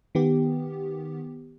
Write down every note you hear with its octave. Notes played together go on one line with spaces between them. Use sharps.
D#3 B3 G4